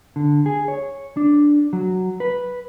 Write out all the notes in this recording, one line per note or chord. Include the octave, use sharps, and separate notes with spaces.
D3
G#4
C#5
D4
F#3
B4